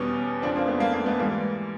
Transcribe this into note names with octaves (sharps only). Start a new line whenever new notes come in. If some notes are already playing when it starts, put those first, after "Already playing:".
Already playing: E2 B2 G3 B3 C#4
F2 C#3 F3 C4 D4
A#3 C4
A3 B3
A#3
A#3
A3 B3
G#2 E3 G3 A#3